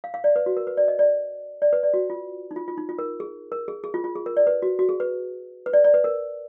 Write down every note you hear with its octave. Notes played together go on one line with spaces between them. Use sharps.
F5
F5
D5
B4
F#4
A#4
B4
D5
D#5
D5
D5
B4
D5
F#4
F4
D#4
F4
F4
D#4
F4
A#4
G#4
A#4
G#4
G#4
F4
F4
G#4
A#4
D5
B4
F#4
F#4
G#4
B4
B4
D5
D5
B4
A#4